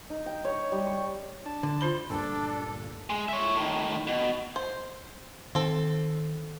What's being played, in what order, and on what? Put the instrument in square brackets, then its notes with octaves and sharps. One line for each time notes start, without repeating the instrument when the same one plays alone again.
[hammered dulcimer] D#4
G5
C#5
G3
C#6
[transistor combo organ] D4 A5
[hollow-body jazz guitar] D3
[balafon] F4 C5 B5
[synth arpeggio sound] D2 G2 A#2 [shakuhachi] D4 [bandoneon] A4
[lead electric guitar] G#3
C#5 E5
A2 D#3
B2
[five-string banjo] C5
[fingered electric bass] D#3 [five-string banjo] C4 A4